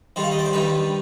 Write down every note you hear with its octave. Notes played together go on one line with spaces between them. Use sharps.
D#3 G3 D4 C5
F5
D#5
D5
C5
D#3 G3 D4 B4